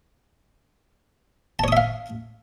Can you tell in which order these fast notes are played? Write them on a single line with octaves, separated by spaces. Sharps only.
A5 C#5 D#6 E5 F5